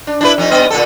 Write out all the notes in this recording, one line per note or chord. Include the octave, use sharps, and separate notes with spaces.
D4
D4 E4 B4
F2 D#4
G2 B3 D#5
A#2 D3 A4